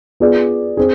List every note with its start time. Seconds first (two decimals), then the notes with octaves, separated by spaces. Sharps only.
0.20 B3 F4 G#4 D5
0.77 C4 G#4